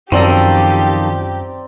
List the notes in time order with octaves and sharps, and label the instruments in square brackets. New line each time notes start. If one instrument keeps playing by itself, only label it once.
[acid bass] F#2 [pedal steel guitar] D#3 F3 A4 [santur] C4 D5 A#5 [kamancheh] G4